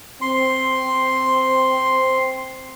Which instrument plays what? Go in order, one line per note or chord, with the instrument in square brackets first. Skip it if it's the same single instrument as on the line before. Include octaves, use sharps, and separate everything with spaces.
[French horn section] C4 [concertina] C6